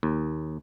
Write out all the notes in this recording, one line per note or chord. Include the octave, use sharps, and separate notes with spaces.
D#2